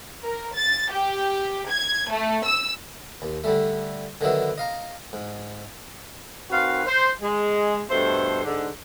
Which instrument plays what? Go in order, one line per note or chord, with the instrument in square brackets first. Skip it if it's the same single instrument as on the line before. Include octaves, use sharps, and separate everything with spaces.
[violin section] A#4
A6
G4
G#6
A3
E6
[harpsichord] D#2
D3 G3 A3
D3 D#3 F#3 B3 E4
D#5 F5 A#5
G#2
[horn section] D#3 C4 F#4 B4 F5
C5
G#3
G2 B2 A3 A4 C5
G#2 D3